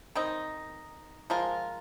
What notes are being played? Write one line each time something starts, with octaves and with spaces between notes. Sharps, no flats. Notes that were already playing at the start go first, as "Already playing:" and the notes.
D#3 C4 D#4
F3 G#3 F4 A#4